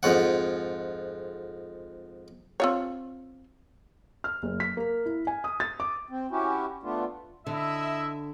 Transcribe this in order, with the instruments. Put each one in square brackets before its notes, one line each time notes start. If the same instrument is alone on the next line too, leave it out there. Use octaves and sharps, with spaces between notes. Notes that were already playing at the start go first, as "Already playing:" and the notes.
[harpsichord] F2 G#2 F#5
[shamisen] C4 F4 C#5
[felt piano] F6
F#1
B6
A#3
E4
G#5
D#6
A6
D6
[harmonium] C4
C#4 E4 F#4 G4
A3 B3 D4 F4
[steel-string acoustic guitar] D3 [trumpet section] E4 D#5 E5